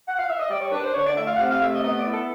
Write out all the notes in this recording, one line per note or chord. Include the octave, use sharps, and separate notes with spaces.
F#5
F5
E5
D#5
G3 D5
C#5
D4 B4
C5
D3 C#5
D5
A3 E5
F5
F#5
C3 F5
F5
A3 E5
D#5
B3 D#5
D5
E4
A4